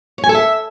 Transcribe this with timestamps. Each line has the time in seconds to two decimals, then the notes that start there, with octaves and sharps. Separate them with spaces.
0.18 C#5
0.24 G#5
0.29 A4
0.35 E5